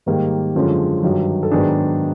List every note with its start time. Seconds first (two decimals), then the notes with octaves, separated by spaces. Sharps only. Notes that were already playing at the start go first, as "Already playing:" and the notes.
0.06 G#2 D#3 G3 A#3 G4
0.56 F#2 D3 F3 G#3 C#4
1.03 G2 D#3 F#3
1.43 A4
1.51 G#2 D#3 F#3 B3 D4 G#4